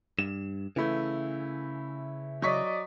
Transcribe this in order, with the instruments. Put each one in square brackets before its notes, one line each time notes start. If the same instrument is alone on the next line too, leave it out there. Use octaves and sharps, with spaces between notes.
[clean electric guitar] G2 [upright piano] E7
[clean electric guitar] C#3 E4 [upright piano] E3 A3
[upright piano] F#3 C#6 B6 [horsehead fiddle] D5 D#5